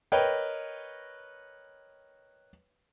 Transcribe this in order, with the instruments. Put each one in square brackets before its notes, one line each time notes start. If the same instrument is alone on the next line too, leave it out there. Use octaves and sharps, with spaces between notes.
[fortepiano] A#4 B4 C#5 D#5 G5